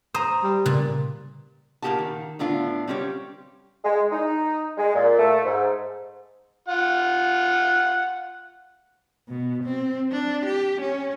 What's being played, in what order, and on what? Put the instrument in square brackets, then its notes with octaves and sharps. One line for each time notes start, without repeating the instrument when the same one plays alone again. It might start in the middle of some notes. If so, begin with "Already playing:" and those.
[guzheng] C5 [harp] A#5 D#6
[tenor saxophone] G3
[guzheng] A#2 [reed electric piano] C#3
[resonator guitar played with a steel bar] A#2 A#3 C4 G4 F#5 A5
D#3
A2 D3 B3 D4 F4
G3 C4 C#4 G4 C#5
[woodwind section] G#3
D#4
G#3
A#2
A3
G#2
[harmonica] F4 F#5
[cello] B2
C4
D4
G4
C#4